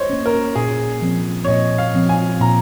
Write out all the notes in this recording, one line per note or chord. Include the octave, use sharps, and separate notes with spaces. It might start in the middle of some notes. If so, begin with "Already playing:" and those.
Already playing: C5 C#5 D#5
A#3 C#4
A#4
A#2 G#4
F3 C4
C#5
A#2 D#5
F5
F3 C4
G#5
A#2 A#5